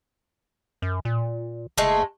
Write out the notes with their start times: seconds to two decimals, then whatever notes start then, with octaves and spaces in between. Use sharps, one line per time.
0.82 F#2
1.05 A#2
1.78 F#1 G#3 A3